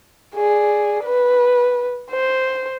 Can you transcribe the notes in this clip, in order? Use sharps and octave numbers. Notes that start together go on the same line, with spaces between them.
G#4 D5
B4
C5